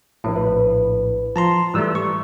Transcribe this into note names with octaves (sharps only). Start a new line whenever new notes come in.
A#1 A2
B4
F3 A5 A#5 C6
G#2 E3 G3 A3 E6
C#6